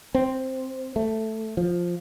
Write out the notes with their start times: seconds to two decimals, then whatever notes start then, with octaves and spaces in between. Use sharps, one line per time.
0.15 C4
0.96 A3
1.57 F3